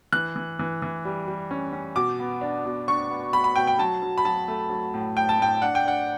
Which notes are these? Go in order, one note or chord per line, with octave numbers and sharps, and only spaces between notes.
E3 F#6
E3
E3
E3
G3
G3
C#4
C#4
B2 D6
B3
D4
B2
D4 C#6
B3
B3 B5
B5
B2 G5
G5
F#3 A5
F#3
B5
F#3 A5
A3
F#3
A2
A2 G5
A5
A2 G5
D4 F#5
G5
D4 F#5